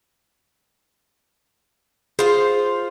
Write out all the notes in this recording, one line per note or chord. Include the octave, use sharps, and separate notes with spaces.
F4 G#4 C5